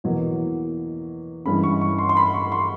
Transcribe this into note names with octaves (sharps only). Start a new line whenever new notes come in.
E2 B2 F#3 A#3
G2 E3 G#3 C#4 B5
C#6
C#6
C6
C6
B5
C#6
C6